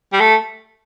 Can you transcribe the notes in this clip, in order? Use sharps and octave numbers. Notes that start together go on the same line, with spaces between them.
G3
A3